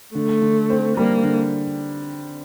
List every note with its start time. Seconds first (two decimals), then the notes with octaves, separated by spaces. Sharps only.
0.15 D3 A3
0.42 D3
0.70 C4
0.97 G3 A#3
1.23 D3